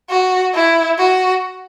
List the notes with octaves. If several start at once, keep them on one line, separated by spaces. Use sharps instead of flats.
F#4
E4
F#4